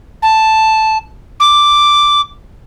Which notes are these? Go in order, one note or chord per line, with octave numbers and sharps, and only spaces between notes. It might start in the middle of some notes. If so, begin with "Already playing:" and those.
A5
D6